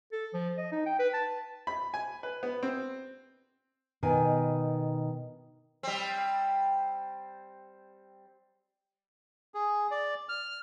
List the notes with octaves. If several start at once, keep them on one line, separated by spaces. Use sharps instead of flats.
A4
F3
D#5
D#4
G5
B4
A5
B5
G#5
B4
B3
C4
B2 D#3 G#5
G3 C4
G#4
D5
F6